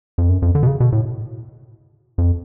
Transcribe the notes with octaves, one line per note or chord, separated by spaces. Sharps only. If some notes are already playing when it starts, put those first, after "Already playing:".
F2
F#2
F2
D3
B2
C#3
B2
A2
F2